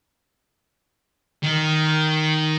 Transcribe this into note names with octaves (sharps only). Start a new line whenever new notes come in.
D#3